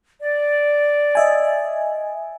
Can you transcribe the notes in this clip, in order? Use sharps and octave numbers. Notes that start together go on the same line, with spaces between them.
D5
D#5 E5 G#5